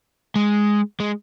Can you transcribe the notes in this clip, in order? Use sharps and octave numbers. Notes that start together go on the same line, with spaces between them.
G#3
G#3